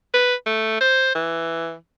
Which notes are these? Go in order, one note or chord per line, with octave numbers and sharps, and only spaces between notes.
B4
A3
C5
E3